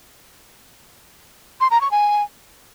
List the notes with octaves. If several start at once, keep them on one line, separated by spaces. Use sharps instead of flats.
C6
A#5
C#6
G#5